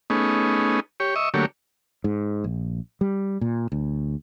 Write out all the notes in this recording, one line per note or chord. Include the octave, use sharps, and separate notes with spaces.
A3 B3 C#4 D#4 G#4
G4 C#5
D#5 E5 C#6
D3 F#3 A3 A#3 G4 C#5
G#2
A#1
G3
A#2
D2